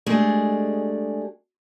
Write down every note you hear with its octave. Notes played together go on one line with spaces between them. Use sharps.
G#3 A3 D4 G4 G#4